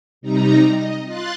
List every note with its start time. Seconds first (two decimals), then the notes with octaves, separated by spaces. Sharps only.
0.21 C3 G3 D#4 A#5
0.70 D#5
1.05 F4 C6 F#6 A6